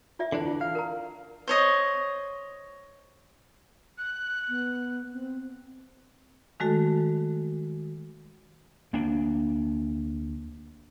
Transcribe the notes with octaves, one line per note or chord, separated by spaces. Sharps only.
F4 D5 E5
D3 E3 D4
F4
F5
A#4 A#5
C5 C#5 D#5
F#6
B3
C4
D#3 G#3 A3 F#4 A4
D2 A#3 D4